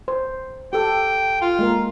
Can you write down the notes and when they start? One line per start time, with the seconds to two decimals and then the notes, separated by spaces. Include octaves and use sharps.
0.08 C5
0.73 G4 A4 G5
1.42 F4
1.59 G#3 A#3 A#4